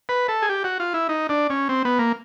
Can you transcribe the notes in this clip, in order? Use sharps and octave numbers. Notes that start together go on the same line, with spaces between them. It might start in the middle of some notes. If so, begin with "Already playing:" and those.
B4
A4
G#4
G4
F#4
F4
E4
D#4
D4
C#4
C4
B3
A#3